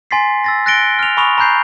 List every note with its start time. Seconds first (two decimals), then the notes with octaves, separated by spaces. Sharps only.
0.11 G#5 C6 A6 B6 C7
0.44 E6 A6 A#6
0.66 F#6 A6 A#6 C#7 D7 G7
0.99 F6 F7
1.17 G#5 B5 C#6 D#6 F7
1.38 A#5 B5 F#6 G6 C7